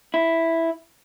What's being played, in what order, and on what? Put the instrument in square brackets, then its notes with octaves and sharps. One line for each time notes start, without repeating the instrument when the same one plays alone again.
[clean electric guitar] E4